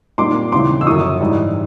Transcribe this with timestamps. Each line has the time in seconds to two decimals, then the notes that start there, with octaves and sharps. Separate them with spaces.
0.18 A#2 G3 C4 D#4 C6 D6
0.52 D#2 C#3 E3 G3 C4 C6 D6
0.81 E6
0.87 F#2 D3 F3 C#6 D#6
1.20 G#2 E3 G3